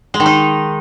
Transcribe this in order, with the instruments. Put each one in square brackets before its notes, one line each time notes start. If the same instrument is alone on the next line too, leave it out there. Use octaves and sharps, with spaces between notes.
[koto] G#3
D#3
D#4